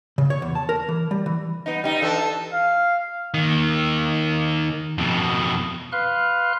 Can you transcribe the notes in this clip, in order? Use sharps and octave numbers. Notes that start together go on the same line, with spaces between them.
C#3
C#5
E2
A5
A#4
E3
G3
E3
B3 D#4
G3 D#4
E3 D4 A4
F5
D#2 D#3
F2 B2
B4 F5 C6 F6 F#6